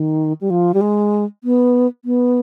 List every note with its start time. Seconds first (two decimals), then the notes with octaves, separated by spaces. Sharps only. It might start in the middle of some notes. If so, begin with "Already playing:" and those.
Already playing: D#3
0.41 G3
0.50 F3
0.74 G3
0.81 G#3
1.44 B3
2.05 B3